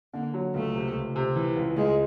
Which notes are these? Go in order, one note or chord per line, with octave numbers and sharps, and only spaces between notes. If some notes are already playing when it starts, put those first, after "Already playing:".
D3 A#3
F#3
C#2 A3
C3
C#2
C3
E3
C#2
C#2 G#3